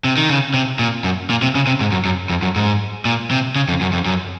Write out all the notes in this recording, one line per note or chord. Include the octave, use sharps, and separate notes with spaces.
C3
D#3
C#3
C3
A#2
F#2
A#2
C3
C#3
C3
G#2
F#2
F#2
F2
F#2
G#2
A#2
C3
C#3
F2
F#2
F2
F#2